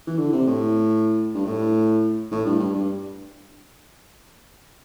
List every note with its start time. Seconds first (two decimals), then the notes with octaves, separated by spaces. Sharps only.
0.07 E3
0.18 D3
0.33 C3
0.47 A2
1.35 G2
1.46 A2
2.31 A2
2.45 G2
2.59 G2
2.74 G2